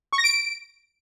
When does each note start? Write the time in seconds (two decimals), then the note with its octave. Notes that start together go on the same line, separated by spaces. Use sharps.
0.13 C#6
0.18 A#6
0.24 D7